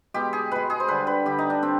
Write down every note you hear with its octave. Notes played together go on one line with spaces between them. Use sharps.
B2 G#3 G4
G#4
B2 G#3 B4
G#4
C5
D3 G3 B4
B4
D3 G3 G4
D#4
D4
D3 C4